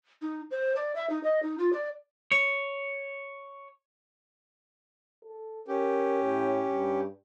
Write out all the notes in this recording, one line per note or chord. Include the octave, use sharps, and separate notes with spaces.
D#4
C5
D5
E5
D#4
D#5
D#4
F4
D5
C#5
A4
C#4 G4 A#4
A2
G2